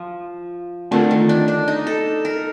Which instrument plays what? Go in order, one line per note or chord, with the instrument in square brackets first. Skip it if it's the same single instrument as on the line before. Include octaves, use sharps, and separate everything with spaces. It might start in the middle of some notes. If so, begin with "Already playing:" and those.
Already playing: [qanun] F3
[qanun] D3 [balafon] A3 C4 F4 A#4
[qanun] D#3
D4
D4
D#4
A4
A#4